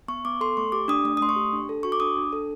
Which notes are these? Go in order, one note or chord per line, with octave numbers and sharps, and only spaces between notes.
B3 C#6
B3 D6
A4 C6
A3 C#6
G4 D6
D4 D#6
A3 D#6
D#6
A3 C6
C#6
G4
D4
A4
F#4 C#6
D6
D4 D#6
D4
A4